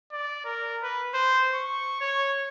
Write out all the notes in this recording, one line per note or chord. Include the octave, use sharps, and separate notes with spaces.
D5
A#4
B4
C5
C#6
C#5